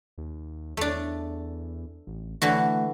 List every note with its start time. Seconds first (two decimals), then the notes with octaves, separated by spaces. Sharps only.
0.18 D#2
0.77 E2 A3 D4
2.07 A1
2.42 D3 E3 A3 F#4